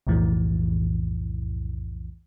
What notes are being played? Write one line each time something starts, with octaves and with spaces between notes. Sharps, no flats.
B1 F2 A2 E3